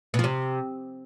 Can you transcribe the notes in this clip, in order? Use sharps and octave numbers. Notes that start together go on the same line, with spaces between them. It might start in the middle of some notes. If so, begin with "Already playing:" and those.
B2
F3
C3